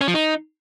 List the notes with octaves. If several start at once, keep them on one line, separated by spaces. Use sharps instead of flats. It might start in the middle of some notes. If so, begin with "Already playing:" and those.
C#4
F3
D#4